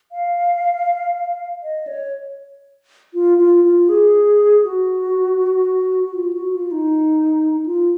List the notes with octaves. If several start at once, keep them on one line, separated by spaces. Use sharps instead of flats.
F5
D#5
C#5
F4
F4
F4
G#4
F#4
F#4
F4
F#4
F4
D#4
F4